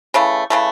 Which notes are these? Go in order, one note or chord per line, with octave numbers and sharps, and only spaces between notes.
C#3 E3 A3
C#3 E3 A3